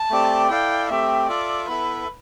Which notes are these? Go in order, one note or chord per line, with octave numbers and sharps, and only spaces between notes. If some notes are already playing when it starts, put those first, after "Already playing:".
Already playing: A5
A3 C4 G4 D5
E4 A4 D5 F5 G5
A3 C4 G4 E5
F4 A4 D5 E5
B3 E4 A4 B4 E5